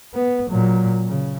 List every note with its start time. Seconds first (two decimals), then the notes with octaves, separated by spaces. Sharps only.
0.14 B3
0.50 A#2 F#3
1.07 C#3